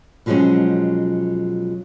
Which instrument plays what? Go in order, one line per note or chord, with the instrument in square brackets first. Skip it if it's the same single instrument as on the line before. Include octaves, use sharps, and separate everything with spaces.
[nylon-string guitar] B2 F3 F#3 G#3 C4 C#4